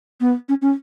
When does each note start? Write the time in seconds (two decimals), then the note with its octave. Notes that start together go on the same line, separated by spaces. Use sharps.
0.21 B3
0.49 C#4
0.62 C#4